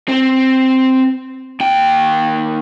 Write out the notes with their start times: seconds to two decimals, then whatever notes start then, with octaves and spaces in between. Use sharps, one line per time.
0.08 C4
1.60 D#2 G5